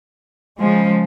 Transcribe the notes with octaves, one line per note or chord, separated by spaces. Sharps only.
C#3 F3 G#3